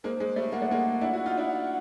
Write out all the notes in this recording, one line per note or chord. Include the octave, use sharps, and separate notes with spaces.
G#3 A#3 C5
G#3
G3 A3
A#3 F#5
A3
G#3 A#3
D4 E4
E4 F#4
D#4 F4
D4 E4